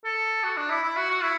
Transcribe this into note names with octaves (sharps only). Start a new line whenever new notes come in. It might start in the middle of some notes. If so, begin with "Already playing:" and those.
A4
F#4
D4
E4
E4
F#4
F#4
E4